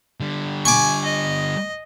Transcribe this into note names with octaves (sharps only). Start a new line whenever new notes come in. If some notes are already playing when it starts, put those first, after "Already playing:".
D3 G3
G#5 C#6 D6
D#5